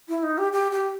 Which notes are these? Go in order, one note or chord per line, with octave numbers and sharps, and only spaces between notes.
E4
D#4
G4
G4
G4